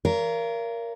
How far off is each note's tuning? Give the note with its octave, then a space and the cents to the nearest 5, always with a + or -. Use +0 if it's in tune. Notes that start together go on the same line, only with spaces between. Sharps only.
A#4 +0 C#5 +40 F5 -35